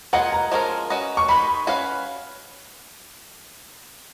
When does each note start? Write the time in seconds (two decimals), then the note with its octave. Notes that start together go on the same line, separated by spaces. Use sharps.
0.13 A#3 F4 G#4 B4 D#5 F#5
0.32 A#5
0.51 F3 G#3 C#4 F#4 A#4
0.90 C#4 F#4 B4 D#5
1.17 C#6
1.28 D#3 G#3 D#4 B5
1.67 C#4 F#4 B4 F5